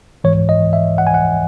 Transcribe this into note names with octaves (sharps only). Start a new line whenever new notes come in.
G#2 E3 G#3 C#5
D#5
E5
F#5
G#5
F#5